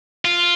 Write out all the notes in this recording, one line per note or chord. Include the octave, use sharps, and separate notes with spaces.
F4